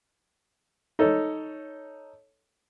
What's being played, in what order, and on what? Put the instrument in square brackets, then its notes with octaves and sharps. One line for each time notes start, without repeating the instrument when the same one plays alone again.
[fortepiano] D#4 A4 C#5